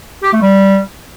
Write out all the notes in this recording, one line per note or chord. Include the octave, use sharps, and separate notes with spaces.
G4
A3
G3